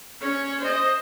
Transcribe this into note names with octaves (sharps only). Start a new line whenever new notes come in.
C#4 C#5
C5 D#5